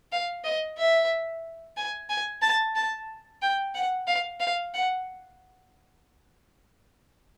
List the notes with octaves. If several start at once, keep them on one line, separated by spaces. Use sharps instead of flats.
F5
D#5
E5
G#5
G#5
A5
A5
G5
F#5
F5
F5
F#5